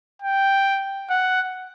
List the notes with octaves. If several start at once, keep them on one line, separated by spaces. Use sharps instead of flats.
G5
F#5